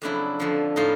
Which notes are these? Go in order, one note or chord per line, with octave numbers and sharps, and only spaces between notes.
F2 C#3 F#3 D4 E4
F2 D3 F3
A2 F3 D#4 F4